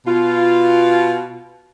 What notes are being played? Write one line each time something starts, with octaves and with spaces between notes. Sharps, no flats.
B2 F4